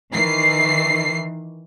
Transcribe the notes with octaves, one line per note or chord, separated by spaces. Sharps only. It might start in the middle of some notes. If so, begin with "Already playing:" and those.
D#3 E3 C7